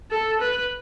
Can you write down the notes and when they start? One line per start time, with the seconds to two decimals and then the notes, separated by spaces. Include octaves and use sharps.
0.11 A4
0.41 B4